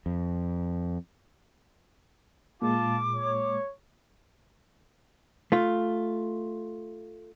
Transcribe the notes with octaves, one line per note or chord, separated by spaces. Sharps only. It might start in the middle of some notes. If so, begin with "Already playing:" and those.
F2
A#2 G#3 F4 A5 D6
C#5
A3 F4